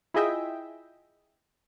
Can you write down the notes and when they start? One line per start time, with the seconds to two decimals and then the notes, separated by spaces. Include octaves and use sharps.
0.14 E4 F4 G#4 D#5 E5 G5